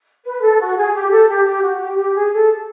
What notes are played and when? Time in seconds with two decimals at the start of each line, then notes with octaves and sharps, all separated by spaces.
0.25 B4
0.42 A4
0.60 F#4
0.77 G#4
0.94 G4
1.11 A4
1.28 G4
1.45 G4
1.63 F#4
1.80 G4
1.98 G4
2.14 G#4
2.32 A4